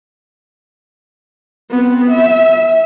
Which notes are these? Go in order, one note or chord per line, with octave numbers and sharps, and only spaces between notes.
B3 C4
E5